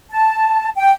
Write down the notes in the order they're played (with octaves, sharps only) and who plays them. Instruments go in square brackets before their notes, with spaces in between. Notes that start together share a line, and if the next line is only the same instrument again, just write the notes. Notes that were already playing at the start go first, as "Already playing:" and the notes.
[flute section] A5
G5